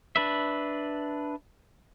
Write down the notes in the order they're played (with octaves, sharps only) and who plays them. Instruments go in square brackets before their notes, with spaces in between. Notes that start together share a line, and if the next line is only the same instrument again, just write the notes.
[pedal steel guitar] D4 B4 E5